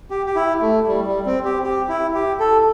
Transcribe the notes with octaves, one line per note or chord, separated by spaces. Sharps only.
G4
G4
E4
A3
G3
G3
C4
G4
G4
E4
G4
A4